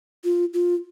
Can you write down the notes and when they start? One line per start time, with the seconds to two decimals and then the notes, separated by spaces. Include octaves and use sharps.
0.24 F4
0.54 F4